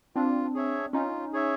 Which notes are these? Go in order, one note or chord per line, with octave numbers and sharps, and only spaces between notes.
C4 D4 F4
G#4 C#5 E5
C#4 D#4 F4
G#4 C#5 E5